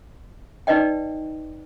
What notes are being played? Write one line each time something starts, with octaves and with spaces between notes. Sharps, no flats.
D#4 B4 D5 D#5 G5